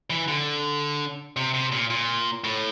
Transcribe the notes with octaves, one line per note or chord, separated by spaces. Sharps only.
E3
D3
C3
C3
A#2
A#2
A2